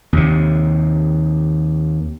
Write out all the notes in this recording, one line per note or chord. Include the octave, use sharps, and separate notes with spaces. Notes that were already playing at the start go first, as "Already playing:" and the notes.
D#2 C3